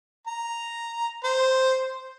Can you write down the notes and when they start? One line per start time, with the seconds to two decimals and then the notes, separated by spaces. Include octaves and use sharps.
0.27 A#5
1.24 C5